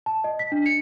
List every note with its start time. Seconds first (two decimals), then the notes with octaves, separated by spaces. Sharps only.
0.06 A5
0.24 D#5
0.39 B6
0.52 D4
0.66 C#7